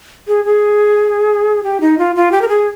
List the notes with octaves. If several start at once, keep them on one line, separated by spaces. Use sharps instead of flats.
G#4
G#4
G4
D#4
F4
F4
G4
A#4
G#4